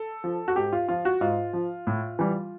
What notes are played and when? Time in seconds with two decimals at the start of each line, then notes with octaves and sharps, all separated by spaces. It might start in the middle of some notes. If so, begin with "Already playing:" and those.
Already playing: A4
0.24 F3
0.48 F#4
0.56 G#2 G4
0.73 F4
0.89 F3 F4
1.05 F#4
1.21 G#2 F4
1.53 F3
1.87 A2
2.19 E3 G3